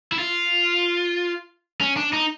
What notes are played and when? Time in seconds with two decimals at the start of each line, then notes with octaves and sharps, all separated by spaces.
0.12 E4
0.19 F4
1.81 C#4
1.97 D4
2.13 D#4